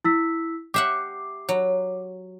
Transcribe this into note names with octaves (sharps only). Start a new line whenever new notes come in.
E4 E6 B6
G4 E5 F#5 D6 C7
F#3